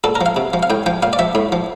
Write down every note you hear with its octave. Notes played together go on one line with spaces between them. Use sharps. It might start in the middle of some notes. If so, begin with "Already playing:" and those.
A#2 A4
A#4
F3
F5
C3
F3
F5
A2 G5
F3 G5
A#2 F5
D5
F3 E5
A2
F3